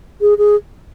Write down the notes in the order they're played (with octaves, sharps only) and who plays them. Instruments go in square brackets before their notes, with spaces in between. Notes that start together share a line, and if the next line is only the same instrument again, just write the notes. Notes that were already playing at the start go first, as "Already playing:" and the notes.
[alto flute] G#4
G#4